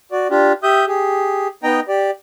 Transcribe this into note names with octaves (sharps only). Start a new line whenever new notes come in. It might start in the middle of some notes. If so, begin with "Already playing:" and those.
F#4 D5
D4 F4 G4
G4 E5 D#6 G6
G4 G#4
B3 D#4 D#5 G5 A#5
G4 D5